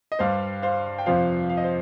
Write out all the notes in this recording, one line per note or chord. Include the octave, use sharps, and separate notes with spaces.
D#5
G2 G3 C5 F5
C5 F5
G5
F2 C3 F3 C5 F5
F5
D#5
C5